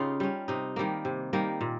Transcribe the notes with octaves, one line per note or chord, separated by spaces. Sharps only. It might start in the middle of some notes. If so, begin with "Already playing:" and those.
Already playing: C#3 D#4 F4 G4
G3 C#4
C3 D#4
D#3 G3 A#3
C3
D#3 G3 A#3
A#2